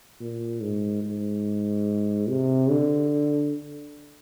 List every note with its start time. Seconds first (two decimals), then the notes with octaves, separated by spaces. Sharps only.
0.21 A#2
0.61 G#2
1.03 G#2
2.29 C3
2.70 D3